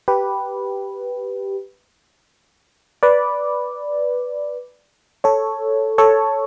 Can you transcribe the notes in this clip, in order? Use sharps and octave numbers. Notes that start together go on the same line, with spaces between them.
G4 B4
B4 D5
A4 C#5
A4 C#5